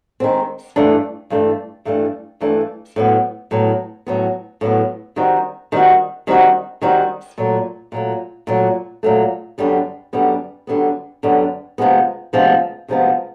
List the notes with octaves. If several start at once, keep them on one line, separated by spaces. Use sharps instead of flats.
D#3 G#3 C4
G2 E3 A3 D4
G2 E3 A3 D4
G2 E3 A3 D4
G2 E3 A3 D4
A2 F#3 B3
A2 F#3 B3
A2 F#3 B3
A2 F#3 B3
D#3 G3 C4 D#4 F#4
D#3 G3 C4 D#4 F#4
D#3 G3 C4 D#4 F#4
D#3 G3 C4 D#4 F#4
A#2 F#3 A3
A#2 F#3 A3
A#2 F#3 A3
A#2 F#3 A3
F#2 D3 G3 B3
F#2 D3 G3 B3
F#2 D3 G3 B3
F#2 D3 G3 B3
D2 C3 F3 G#3 B3
D2 C3 F3 G#3 B3
D2 C3 F3 G#3 B3